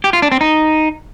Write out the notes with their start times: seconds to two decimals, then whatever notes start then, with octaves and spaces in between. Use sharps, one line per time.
0.04 G4
0.13 F4
0.22 D4
0.32 C4
0.41 D#4